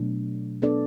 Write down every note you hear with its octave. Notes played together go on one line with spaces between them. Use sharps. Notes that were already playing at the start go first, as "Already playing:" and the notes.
Already playing: B2 F#3 A3 D4
B3 D4 A4 D5